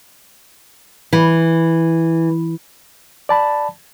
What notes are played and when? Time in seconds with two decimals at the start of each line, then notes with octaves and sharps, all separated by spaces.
1.13 E3
3.29 D5 A5 B5